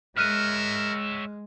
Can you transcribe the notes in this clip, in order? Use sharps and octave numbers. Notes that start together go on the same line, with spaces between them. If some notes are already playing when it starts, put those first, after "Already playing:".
G#3 A#4 C#5 E5 F6 F#6 D#7